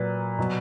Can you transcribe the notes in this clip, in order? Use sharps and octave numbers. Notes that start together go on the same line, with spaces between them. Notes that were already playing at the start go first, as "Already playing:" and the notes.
Already playing: A#2 F#3 B4
B2 F#3